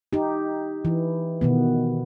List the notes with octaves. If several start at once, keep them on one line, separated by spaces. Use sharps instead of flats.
D#4 G4
E3
B2 D#3 B3